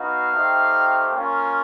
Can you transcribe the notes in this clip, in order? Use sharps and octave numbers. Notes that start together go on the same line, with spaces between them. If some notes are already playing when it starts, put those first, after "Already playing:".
Already playing: B3 D#4 F#4 F5
A3 C4 D#4 G4
A#3 C#4 F4